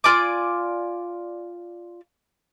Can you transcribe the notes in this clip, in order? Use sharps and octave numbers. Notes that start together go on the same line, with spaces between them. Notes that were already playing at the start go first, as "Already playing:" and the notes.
F4 D5 G#5 D6